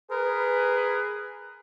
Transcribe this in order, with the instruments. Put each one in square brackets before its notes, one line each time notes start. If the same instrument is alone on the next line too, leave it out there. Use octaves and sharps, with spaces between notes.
[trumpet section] G#4 B4 [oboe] A#4